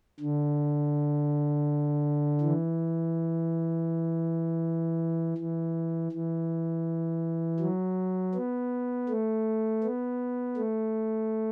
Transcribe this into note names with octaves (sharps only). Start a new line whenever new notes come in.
D3
E3
E3
E3
F#3
B3
A3
B3
A3